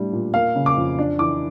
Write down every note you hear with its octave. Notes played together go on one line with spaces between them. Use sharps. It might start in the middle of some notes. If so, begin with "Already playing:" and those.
Already playing: A2 G3 D4
A#2
A#3 F5
C#3
D6
F2
D4
E3 D6